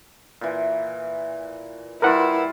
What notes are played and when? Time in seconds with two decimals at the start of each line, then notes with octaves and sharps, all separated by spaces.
0.41 A#2 E3
2.02 G3 E4 F4 A#4 B4 F#5